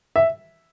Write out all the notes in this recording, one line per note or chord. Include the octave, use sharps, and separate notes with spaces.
E5